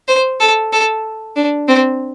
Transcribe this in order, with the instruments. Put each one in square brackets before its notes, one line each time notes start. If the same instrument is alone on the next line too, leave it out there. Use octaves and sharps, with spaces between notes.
[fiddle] C5
A4
A4
D4
C4